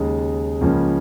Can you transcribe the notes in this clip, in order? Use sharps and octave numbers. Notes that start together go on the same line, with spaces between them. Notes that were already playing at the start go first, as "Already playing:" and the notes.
Already playing: D#2 C#3 G#3 D#4
C#2 C#3 F3 A#3 C#4